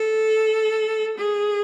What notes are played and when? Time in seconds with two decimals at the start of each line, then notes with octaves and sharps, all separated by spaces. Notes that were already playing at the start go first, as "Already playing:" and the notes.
Already playing: A4
1.17 G#4